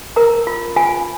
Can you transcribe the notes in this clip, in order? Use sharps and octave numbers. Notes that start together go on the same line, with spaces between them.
A#4 A#5
F4
F4 G#5